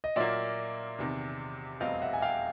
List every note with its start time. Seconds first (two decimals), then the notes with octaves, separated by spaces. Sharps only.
0.04 D#5
0.16 A#2 F#3 A#3 D5 E5
0.98 E2 C3 D#3
1.80 F1 E2 B2 G3 C4 D#5 F5
2.02 E5 F#5
2.13 G#5
2.22 F5 G5